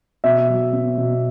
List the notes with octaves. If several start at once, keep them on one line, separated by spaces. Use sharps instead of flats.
B2 E5
F#3
B3
B2